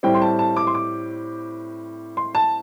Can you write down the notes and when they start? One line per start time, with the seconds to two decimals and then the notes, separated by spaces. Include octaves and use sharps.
0.03 A2 G3 C4 G5
0.14 C6
0.22 A5
0.39 A5
0.57 D6
0.67 C6
0.75 D6
2.17 C6
2.35 A5